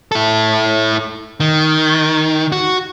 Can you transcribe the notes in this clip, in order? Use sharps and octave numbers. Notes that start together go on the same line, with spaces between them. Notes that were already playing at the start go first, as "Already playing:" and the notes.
E4 A4
D#3
F#4